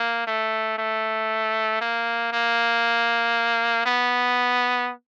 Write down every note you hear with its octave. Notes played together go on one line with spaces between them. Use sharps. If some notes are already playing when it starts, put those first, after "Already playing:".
Already playing: A#3
A3
A3
A#3
A#3
B3